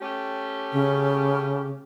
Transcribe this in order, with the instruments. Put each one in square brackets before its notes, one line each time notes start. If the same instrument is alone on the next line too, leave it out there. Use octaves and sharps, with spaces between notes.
[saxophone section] A3 C#4 G4
[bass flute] C#3